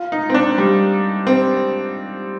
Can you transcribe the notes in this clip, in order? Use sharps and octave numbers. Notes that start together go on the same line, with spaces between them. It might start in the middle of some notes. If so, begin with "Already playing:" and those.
Already playing: F4
D#4
C4
D4
G3
C4